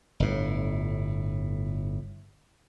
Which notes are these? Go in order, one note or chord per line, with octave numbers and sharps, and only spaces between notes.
G1 A2